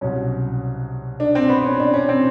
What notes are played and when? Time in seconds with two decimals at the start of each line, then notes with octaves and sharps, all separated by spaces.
0.01 C2 B2 F#3 C#4
1.20 D4
1.35 C4
1.49 B3
1.65 C#4
1.80 D4
1.94 C#4
2.09 C4